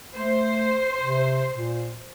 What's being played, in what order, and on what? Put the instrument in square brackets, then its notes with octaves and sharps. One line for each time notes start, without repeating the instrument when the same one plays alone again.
[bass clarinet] A3 [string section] C5
[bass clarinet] C3
A#2